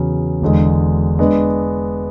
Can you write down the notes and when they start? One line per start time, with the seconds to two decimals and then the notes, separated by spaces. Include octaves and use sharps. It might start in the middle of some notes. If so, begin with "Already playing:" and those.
Already playing: E2 C#3 F#3
0.41 E1 E2 D3 G#3
1.19 G#3 B3 D4